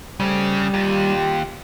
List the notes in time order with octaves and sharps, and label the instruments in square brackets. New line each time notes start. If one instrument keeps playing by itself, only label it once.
[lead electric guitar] C#3 [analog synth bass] G3 [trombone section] A3 C5
[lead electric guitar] D#2 [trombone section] F4 G4